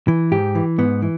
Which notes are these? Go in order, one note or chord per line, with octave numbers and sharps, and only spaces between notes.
E3
G#2 G4
E3
G#2 B3
E3